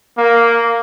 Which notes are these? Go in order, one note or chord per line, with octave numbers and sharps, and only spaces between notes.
A#3